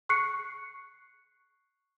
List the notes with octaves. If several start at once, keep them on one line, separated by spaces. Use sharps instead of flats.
C#6 F#6 C7 C#7